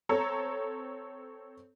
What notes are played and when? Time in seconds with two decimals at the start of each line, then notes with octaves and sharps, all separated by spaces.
0.09 C4 A4 C#5 A#5